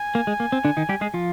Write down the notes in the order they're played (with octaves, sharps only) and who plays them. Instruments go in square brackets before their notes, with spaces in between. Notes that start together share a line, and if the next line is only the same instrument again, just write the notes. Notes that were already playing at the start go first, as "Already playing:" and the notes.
Already playing: [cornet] G#5
[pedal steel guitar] A#3
G#3
A#3
C4
D3 D4
D#3 D#4
G3 G4
G#3 G#4
F3 F4